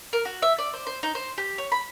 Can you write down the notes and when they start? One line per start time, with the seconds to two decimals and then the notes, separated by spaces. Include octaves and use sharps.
0.13 A#4
0.25 F#4
0.42 E5
0.58 D5
0.73 C5
0.87 C5
1.03 D#4
1.15 C5
1.38 G4
1.58 C#5
1.72 B5